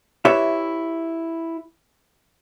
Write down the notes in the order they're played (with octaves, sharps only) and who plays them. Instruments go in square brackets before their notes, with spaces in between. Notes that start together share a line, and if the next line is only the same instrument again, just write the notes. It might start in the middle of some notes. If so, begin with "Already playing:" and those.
[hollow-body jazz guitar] E4 G4 B4 C#5 E5